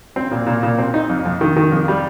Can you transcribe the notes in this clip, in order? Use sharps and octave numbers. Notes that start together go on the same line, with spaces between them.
C4
A#2
A#2
A#2
C4
D#4
F2
F2
D#3
D#3
F2
G3